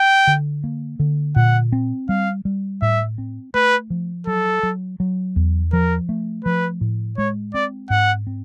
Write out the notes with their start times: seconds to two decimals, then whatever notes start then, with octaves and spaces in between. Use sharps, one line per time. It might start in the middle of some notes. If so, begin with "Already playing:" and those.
Already playing: G5
0.27 D3
0.64 A#3
0.99 D3
1.36 A#2 F#5
1.72 C4
2.09 G3 F5
2.45 G3
2.82 A2 E5
3.18 C4
3.54 A3 B4
3.90 F3
4.27 F#3 A4
4.63 F#3
5.00 F#3
5.36 E2
5.73 F3 A#4
6.09 A3
6.45 F3 B4
6.81 A2
7.18 G#3 C#5
7.54 C4 D5
7.90 G#2 F#5
8.27 C4